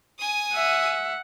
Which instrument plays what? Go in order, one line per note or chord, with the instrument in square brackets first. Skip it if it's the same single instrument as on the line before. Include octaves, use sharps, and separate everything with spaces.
[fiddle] G#5 D#6
[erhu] E5 [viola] F#5